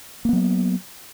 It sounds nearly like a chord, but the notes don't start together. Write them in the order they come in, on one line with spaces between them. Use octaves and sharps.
A#3 B3 F#3